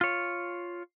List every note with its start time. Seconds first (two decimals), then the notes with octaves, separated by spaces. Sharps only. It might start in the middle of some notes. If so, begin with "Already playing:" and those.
0.01 F4 C#5